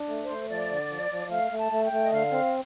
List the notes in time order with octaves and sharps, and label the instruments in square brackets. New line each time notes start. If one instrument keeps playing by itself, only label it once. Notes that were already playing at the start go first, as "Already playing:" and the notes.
Already playing: [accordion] D4
A3
[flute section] C5
[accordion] A3
[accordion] F3 [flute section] D5
[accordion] D3
F3
F3
[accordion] A3 [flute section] F5
[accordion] A3
[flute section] A5
[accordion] A3
[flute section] G5
[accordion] A3
[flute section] D#5
[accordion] D3 [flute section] F5
[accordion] C4